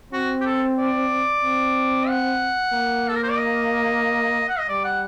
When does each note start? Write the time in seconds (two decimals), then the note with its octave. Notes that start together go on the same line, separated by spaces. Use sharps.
0.13 C4 F#4
0.41 G4
0.46 A4
0.78 D5
1.43 C4
2.08 F#5
2.72 A#3
3.08 A4
3.16 A#4
3.23 C5
3.30 D5
3.38 D#5
4.49 F#5
4.59 D#5
4.68 G3 D5
4.84 F#5